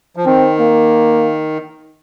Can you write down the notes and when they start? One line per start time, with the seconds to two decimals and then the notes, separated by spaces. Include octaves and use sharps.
0.16 F3
0.26 D#3 C4
0.60 A#3